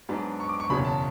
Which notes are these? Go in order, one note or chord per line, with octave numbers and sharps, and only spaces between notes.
G#2 F#3 B3 D4
C#6
D6
C#6
F#1 E2 B2 F#3 C#4 B5
A5